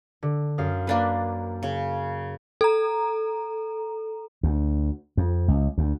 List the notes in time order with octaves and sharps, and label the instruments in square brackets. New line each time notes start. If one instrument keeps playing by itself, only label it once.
[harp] D3
F#2 F5 D#6
[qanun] A#3 D4 B4
C#3
[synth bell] A4 A#5
[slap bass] D2
F2
C#2
D2